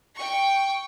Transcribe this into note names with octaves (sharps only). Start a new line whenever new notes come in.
G5 C#6